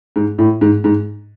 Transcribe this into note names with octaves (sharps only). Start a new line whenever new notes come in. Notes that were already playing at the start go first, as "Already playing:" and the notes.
G#2
A2
G#2
G#2